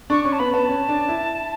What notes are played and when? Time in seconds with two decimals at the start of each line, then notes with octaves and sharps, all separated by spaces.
0.10 D4 C#6
0.25 C#4 C#6
0.33 A5
0.39 B3 B5
0.54 B3 A5
0.69 C#4
0.89 D4
1.09 E4